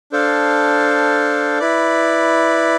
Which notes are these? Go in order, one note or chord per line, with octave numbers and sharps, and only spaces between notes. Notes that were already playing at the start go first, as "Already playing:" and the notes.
D4 A4 C5 F5
E4 B4 D5